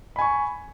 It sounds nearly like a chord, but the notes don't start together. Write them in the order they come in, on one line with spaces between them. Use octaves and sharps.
B5 G#5 C#6